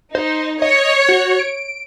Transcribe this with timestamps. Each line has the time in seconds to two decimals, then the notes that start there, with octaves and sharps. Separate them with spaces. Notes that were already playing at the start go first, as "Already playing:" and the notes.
0.15 D#4 C5
0.62 C#5 D#5
1.09 F#4
1.39 D7